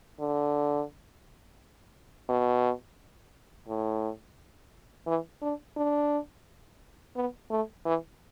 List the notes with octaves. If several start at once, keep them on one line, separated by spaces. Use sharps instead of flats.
D3
B2
A2
E3
D4
D4
B3
A3
E3